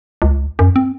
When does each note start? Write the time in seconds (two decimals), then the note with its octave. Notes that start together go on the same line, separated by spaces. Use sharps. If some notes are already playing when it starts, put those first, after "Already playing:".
0.22 C#2
0.59 F#2
0.76 C4